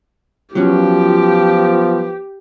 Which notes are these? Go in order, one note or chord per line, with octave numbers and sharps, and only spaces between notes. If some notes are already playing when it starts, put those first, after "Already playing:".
F3 F#3 B3 C#4 G4